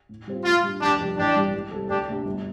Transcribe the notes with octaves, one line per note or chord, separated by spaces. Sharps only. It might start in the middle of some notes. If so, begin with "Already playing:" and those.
A2
G3 C4 F4
A2 F4
G3 D4
F1 D4 G4
F2 C3 G3
A1 D4 G4
G2 G3
C2
C3 G3 C4 A4
D2 D4 G4
C3 A3 D4
G1